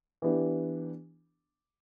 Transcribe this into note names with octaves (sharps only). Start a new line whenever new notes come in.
E3 B3 D4 G4